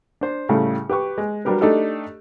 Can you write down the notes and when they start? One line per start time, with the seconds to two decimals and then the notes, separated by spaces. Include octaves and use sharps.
0.21 D4 C5
0.49 A2 C#3 G3 A3
0.89 G4 B4 G5 C#6
1.18 G#3
1.45 F#3 G3 D4 G4 A#4 B4
1.61 A3 D4 D#4 G4 A4